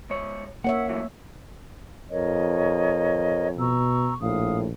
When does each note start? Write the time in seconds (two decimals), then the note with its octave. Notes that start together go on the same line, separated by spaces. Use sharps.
0.10 G#2 C#5
0.64 A#3 C#5 E5 F#5
0.89 A2 E3 F#3
2.10 F2 A#4 C#5 D#5
3.58 B2 A#5 C#6 E6
4.21 A#1 A2 F5 D#6